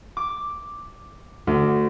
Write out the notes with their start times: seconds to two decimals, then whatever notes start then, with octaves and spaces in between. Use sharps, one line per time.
0.17 D6
1.47 D2